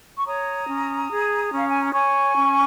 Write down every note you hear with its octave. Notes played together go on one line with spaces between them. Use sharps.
C#6
C#5 A#5 D#6
C#4
G#4
C#4 F5
G#5
A#5
C#5 G#5 C#6
C#4